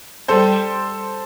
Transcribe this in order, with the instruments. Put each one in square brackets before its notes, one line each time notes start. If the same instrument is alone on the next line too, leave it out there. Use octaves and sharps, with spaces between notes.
[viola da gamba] G3 [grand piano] A4 C5